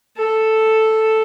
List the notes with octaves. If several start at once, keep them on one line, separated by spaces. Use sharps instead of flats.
A4